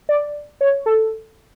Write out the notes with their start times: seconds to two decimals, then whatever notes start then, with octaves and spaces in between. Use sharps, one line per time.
0.09 D5
0.61 C#5
0.86 A4